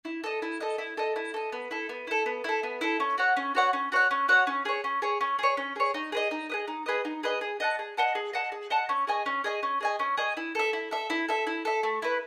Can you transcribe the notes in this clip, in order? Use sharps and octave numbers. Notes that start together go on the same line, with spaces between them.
E4
A4 D#5
E4
A4 D#5
E4
A4 D#5
E4
A4 D#5
B3
E4 A4
B3
E4 A4
B3
E4 A4
B3
E4 A4
C#4
F#4 C#5 F#5
C#4
F#4 C#5 F#5
C#4
F#4 C#5 F#5
C#4
F#4 C#5 F#5
C#4
G#4 C#5
C#4
G#4 C#5
C#4
G#4 C#5
C#4
G#4 C#5
D#4
G#4 B4 D#5
D#4
G#4 B4 D#5
D#4
G#4 B4 D#5
D#4
G#4 B4 D#5
G#4
D#5 F#5 A5
G#4
D#5 F#5 A5
G#4
D#5 F#5 A5
G#4
D#5 F#5 A5
C#4
G#4 D#5 G#5
C#4
G#4 D#5 G#5
C#4
G#4 D#5 G#5
C#4
G#4 D#5 G#5
E4
A4 E5
E4
A4 E5
E4
A4 E5
E4
A4 E5
A3
E4 B4